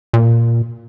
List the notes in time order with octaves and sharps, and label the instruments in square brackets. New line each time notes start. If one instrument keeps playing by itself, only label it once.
[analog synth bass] A#2